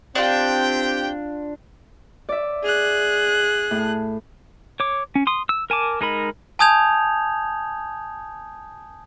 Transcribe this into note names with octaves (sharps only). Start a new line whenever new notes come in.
C4 D4 F4 G4 G5
D5 E5
G#4 F#6
A2
C#5 D6
C#4
C6 D#6
E6
A#4 G#5 A5 D6
G#3 D#4 A#4 B5
G#5 A5 D#6 G6 G#6 F7